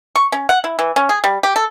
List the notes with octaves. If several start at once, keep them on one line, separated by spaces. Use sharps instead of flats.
C#6
C#4
F#5
E4
E3
C#4
G#4
G3
G4
A4